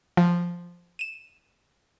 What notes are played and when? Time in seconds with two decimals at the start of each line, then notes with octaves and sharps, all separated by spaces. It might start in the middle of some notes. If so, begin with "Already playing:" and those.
0.17 F3
0.99 D#7 E7